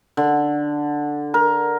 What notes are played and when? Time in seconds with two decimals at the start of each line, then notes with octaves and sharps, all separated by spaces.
0.17 D3
1.34 A#4